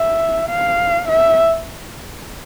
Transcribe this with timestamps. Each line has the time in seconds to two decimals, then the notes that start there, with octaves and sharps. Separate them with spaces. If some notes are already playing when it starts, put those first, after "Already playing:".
Already playing: E5
0.49 F5
1.09 E5